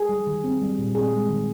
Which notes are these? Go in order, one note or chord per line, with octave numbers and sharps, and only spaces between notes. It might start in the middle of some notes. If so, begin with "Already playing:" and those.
Already playing: G#4
G3
D#3
C4
G3
A#2
C4 G#4
G#3
D#3